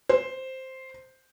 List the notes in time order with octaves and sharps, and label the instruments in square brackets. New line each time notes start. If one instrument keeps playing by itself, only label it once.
[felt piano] C5